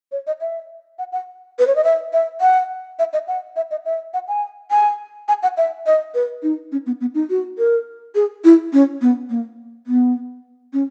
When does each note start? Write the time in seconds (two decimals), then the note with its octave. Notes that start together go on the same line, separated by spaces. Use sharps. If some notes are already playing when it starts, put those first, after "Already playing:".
0.12 C#5
0.27 D#5
0.41 E5
0.99 F#5
1.12 F#5
1.59 B4
1.67 C#5
1.76 D#5
1.84 E5
2.13 E5
2.41 F#5
2.99 E5
3.13 D#5
3.28 F#5
3.56 E5
3.71 D#5
3.85 E5
4.14 F#5
4.28 G#5
4.71 G#5
5.28 G#5
5.43 F#5
5.57 E5
5.86 D#5
6.15 B4
6.43 D#4
6.72 C#4
6.86 B3
7.01 B3
7.14 D#4
7.30 F#4
7.58 A#4
8.15 G#4
8.44 E4
8.73 C#4
9.02 B3
9.30 A#3
9.87 B3
10.73 C#4